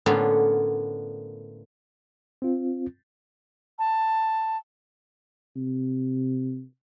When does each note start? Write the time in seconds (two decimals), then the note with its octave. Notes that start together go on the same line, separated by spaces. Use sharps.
0.06 A2 D3 A#3 B3 C#4 F4
2.42 C4 F4
3.79 A5
5.57 C3